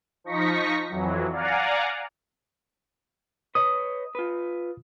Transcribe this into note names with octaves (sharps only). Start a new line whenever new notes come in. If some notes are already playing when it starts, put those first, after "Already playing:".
F3 D#4 C#6 A#6 B6 C#7
F2 E3 F#3
D5 F5 F#5 G#5 A#5
B4 C#5 D#5 D#6
F4 B4